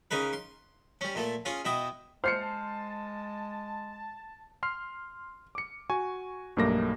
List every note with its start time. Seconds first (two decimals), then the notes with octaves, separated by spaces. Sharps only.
0.11 C#3 D#4 A#4 B4
0.33 C6
1.01 G3 C#4
1.15 A#2 A3 A#3
1.45 C#4 F4 G#4
1.65 B2 E4 D#5 G5
2.24 G#3 C5 A5 F6 C7 C#7
4.63 C6 F6 C7
5.55 D6 C#7
5.90 F#4 G#5 C#6
6.57 B1 G2 A3 A#3 D6 A#6